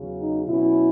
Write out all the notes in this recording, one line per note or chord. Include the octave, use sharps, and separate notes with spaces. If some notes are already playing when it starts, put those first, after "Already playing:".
Already playing: E2 C#3 F#3
D#4
B2 F#3 C#4 E4